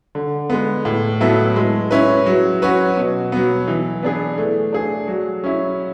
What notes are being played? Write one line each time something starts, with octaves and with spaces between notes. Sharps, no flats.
D3
G#3 B3
A2
F#3 B3 E4 A4
G#3
C#4 E4 B4
F#3
C#4 F#4 B4
B2
F#3 B3
E3
B3 D4 G#4
A3
D4 G#4
F#3
C#4 E4